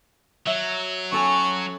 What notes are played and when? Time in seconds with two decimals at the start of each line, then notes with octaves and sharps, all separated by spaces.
0.47 F#3 E5
1.12 C#4 A4 G#5 C#6